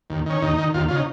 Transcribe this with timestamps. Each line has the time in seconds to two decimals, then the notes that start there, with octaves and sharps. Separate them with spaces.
0.10 D#2
0.26 D#3 C#4
0.42 D#2 D#4
0.58 D#3
0.74 D#2 F4
0.88 C#3 F4
0.96 D#4